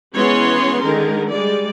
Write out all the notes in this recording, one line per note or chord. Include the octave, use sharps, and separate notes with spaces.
E3 G#3 B3 C#4 C#5 C6
D3 D#3 G#3 A#4
G3 G#3 D5